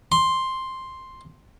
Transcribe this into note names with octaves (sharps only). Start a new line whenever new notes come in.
C6